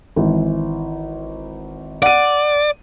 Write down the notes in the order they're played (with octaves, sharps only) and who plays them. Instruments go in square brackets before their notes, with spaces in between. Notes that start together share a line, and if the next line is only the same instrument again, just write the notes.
[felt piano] G#1 E3
[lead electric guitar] D5 [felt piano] F#5 D#7